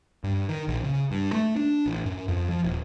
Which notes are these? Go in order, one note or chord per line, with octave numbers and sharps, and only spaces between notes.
G2
D#3
A#1
C#3
G2
A3
D4
A1
F#2
F2
F3
D#1